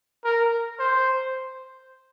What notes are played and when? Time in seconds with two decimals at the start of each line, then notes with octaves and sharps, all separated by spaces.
0.25 A#4
0.79 C5